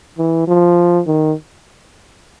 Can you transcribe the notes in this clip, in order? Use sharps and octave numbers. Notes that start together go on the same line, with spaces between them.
E3
F3
D#3